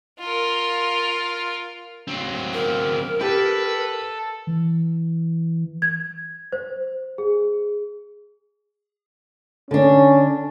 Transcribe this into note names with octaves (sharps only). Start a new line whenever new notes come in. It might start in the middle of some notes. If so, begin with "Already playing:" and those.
F4 A#4
F#3 C4
A#4
G4 A4 B4
E3
G#6
C5
G#4
D3 C#4 D4